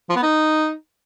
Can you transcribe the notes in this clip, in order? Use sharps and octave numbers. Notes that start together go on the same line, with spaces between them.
F3
B3
D#4